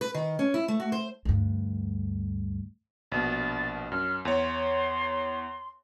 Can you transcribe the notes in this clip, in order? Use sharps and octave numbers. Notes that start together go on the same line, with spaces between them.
B4
D#3
C#4
E4
A3
F#4
C5
D2 G2
A#1 B2 A6
F#2 F6
E2 C#5 C6